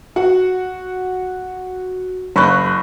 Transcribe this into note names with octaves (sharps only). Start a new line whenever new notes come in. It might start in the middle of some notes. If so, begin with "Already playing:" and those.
F#4 F#5
F#1 B5 C#6 F#6